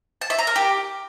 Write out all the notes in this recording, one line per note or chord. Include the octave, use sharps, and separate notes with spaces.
A5
E5
A#5
A#4
G4